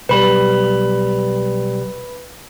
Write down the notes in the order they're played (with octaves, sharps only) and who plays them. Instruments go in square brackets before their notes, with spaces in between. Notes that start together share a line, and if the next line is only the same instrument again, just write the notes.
[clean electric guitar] B1 G3 [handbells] B4 B5